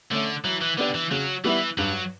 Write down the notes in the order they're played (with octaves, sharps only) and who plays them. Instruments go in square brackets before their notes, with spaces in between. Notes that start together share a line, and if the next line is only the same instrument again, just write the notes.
[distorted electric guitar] D3 [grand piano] A3 C#4
[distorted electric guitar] E3 [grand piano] F#3
[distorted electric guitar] E3
[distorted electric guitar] D3 [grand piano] B3 D4 G4 D5
[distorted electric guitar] E3
[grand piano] C#3 [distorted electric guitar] F#3
[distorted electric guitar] E3 [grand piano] G3 B3 E4
[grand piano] G2 [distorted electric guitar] F#3